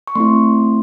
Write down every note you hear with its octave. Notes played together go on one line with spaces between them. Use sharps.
C#6
A3 C4 E4 C6